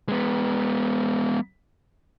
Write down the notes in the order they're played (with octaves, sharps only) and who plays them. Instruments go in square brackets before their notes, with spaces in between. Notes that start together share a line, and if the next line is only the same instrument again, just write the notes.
[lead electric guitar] G#3 B3